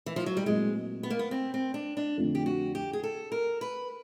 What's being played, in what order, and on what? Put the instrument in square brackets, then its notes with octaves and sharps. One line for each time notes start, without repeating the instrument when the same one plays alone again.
[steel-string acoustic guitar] E3
F3
F#3
G3
[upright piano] A#2 F#3 A3 C4 E4 [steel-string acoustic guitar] G#3
[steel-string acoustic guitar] B3
A#3
B3
C4
C4
D4
D4
[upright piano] F2 D3 F3 A3
[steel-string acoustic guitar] G4
F#4
G4
G#4
A4
A#4
B4